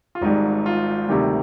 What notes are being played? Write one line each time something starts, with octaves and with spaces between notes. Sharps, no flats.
F4
G#1 G#2 G3 D#4
F4
D2 C3 D#3 G3 G4